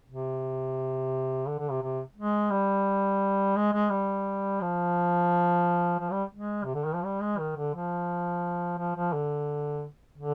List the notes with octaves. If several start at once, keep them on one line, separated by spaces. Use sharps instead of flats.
C3
D3
D3
C3
C3
G#3
G3
G#3
G#3
G3
F3
F3
G3
G#3
C3
D3
D#3
F3
G3
G#3
D#3
D3
F3
F3
F3
D3
D3